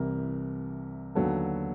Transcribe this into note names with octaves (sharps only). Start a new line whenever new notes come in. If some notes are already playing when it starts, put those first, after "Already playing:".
Already playing: C2 C3 E3 A#4
D#2 D3 F#3 B3 A4